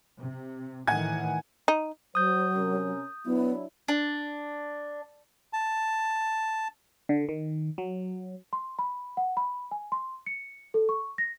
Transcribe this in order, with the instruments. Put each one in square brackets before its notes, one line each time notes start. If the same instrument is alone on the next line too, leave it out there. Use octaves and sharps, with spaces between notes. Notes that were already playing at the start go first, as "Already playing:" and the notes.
[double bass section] C3
[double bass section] A2 D#3 E3 [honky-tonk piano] F#5 G#5 G#6
[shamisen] D#4
[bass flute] F#3 [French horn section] C5 [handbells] D#6 G6
[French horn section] C3 C#4 A#4
[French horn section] F#3 D4 E4 [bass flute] B3
[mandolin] D4
[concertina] A5
[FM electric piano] D3
D#3
F#3
[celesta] C6
B5
F#5
B5
G#5
C6
C#7
A4
C#6
A#6